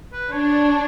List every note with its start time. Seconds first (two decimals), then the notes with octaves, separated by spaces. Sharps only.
0.13 B4
0.32 D4 C#5